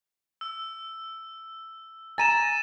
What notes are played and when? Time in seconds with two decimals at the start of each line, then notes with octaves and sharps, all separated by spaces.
0.41 E6
2.18 G#5 A#5 A6 D#7 E7